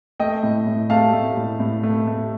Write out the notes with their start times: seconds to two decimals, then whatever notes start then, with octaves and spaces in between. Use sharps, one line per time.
0.20 A3 D#5 G5
0.43 A2
0.67 A2
0.90 A3 F5 A5
1.13 A3
1.37 A2
1.60 A2
1.83 A3
2.07 A3